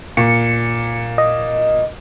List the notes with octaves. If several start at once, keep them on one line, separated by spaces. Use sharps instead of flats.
A#2 C#7
D#5